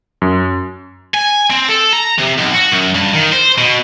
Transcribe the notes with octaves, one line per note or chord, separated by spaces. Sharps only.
F#2
G#5
C4
A4
A#5
C3
B1
F#4
F#2
G2
D#3
C5
B2